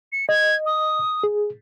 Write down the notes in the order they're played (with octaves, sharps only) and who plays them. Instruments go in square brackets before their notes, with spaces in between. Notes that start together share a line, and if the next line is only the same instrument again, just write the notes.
[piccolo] C#7
[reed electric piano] D#5 [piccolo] G#6
[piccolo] D#6
[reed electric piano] G#4